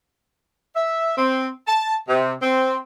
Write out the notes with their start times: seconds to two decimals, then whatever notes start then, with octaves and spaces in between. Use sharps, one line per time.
0.76 E5
1.18 C4
1.67 A5
2.09 C3
2.42 C4